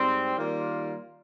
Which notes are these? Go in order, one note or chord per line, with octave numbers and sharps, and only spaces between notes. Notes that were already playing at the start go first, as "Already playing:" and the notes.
Already playing: G#2 G3 C4
D#3 G3 A#3 F4